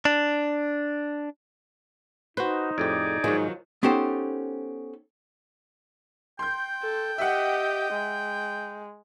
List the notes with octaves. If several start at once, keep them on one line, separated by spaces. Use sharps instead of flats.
D4
D#4 F#4 B4 C5
F2 A2 G4 G#4 D5
G#2 D#3 F3 F#3 G#3
B3 C#4 D#4 G4 A4 C5
G5 C6 G6
A4
G4 D#5 E5 F#5
G#3